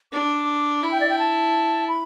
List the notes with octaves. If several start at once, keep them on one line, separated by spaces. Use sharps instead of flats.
D4 D6
E4 B5
G5
D5
G5
A5
B5